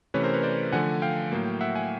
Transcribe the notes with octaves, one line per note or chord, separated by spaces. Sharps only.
C3 E3 A3 C#4 B4 C#5
A#4 C5
B4 C#5
C5 D5
D3 F3 A3 F#5 G#5
F5 G5
A2 F#3 A#3
E5 F#5
F#5 G#5